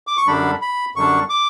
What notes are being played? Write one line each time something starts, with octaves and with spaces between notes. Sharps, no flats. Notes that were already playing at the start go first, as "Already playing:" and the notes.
D6
C#6
F#2 D3 G3 D4 B5
B5
F#2 D3 G3 D4 C#6
D6